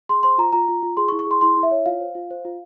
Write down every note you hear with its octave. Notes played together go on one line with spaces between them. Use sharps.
G#4 C6
C5 C6
F4 A#5
F4 A#5
F4
F4
G#4 C6
C#6
E4
C#6
G#4 C6
E4 C6
E4
E5
C#5
F4 F5
C5
F4
C5
F4